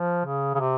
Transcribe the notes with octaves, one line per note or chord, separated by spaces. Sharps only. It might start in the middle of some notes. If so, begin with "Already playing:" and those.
Already playing: F3
C#3
C#3
C3